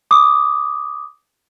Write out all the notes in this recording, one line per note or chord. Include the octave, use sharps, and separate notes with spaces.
D6 D#6